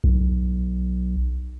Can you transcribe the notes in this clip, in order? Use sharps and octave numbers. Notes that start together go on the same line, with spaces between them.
B1